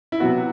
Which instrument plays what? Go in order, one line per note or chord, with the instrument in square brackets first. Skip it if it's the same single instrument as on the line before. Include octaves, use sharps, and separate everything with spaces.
[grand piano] E4
C3 F#3 B3 F#4